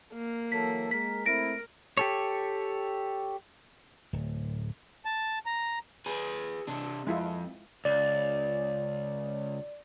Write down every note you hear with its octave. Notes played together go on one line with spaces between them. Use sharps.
A#3
E3 F#3 A4 B6
G#3 A#4 B6
A3 C4 E4 A#4 A#6 D7
G4 A4 C#5
D1
A5
A#5
G#4 B4
C3 D4
F2 G#3 E4 F4
C#2 D5